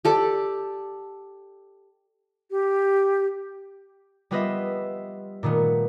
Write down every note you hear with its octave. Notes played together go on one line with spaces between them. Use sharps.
G4 A4 D5
G4
G3 B3 F4 B4 D#5 E5
A#2 D#3 A3 B3